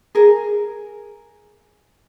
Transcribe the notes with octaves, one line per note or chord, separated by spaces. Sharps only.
G#4 A#4